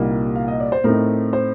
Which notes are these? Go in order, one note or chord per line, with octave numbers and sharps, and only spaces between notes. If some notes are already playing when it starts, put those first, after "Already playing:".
Already playing: C2 A#2 G3 A#3 D#4
F5
D#5
D5
C5
A2 A3 C4 D#4 A#4
C5